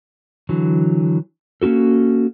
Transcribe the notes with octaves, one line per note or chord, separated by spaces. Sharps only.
D3 E3 F#3
A#3 C#4 E4 F#4 A4